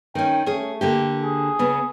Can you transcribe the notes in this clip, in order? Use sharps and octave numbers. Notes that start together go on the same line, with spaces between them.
D#3 C#4 G5
A3 C#4 G#4
D3 A#3 G4
G#4
C#3 B3